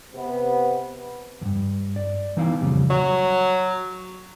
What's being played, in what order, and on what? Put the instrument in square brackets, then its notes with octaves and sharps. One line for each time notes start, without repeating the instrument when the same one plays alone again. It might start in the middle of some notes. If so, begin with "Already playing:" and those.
[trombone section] C3 B3
[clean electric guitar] E2 G2
D5
E3 B3 D#4 E4 F5
F2 A#2 C#3 G3
[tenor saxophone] F#3